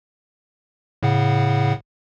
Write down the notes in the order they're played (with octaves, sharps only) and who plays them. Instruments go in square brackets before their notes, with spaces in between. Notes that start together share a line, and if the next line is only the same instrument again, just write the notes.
[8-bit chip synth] A2 C#3 F#5